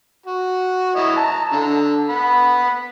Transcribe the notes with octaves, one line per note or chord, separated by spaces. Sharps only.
F#4
E4 C#5 D#5
A5 A#5
D3 A4
F#5 B5